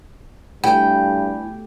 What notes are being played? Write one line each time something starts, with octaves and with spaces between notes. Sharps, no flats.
G2 B2 A3 E4 G4 G5 G#5 B5